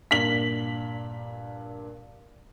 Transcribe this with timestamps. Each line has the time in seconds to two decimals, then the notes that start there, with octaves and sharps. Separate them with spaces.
0.11 G2 A#2 A#4 B6 F#7